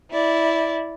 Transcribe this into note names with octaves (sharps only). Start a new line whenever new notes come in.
E4 D5